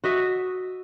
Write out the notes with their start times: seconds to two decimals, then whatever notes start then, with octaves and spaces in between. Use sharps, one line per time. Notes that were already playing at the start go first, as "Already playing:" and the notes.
0.04 F#4 D#5 E5